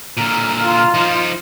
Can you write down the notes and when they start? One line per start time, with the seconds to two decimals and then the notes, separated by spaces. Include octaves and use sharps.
0.17 A#2 D3 A#5 F6
0.63 F4
0.94 F3 D#4